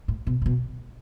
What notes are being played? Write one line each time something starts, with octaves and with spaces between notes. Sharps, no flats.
A2
B2
A#2
B2